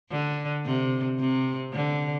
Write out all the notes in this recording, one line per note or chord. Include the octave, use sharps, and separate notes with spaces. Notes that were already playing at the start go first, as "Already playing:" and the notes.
D3
C3
C3
D3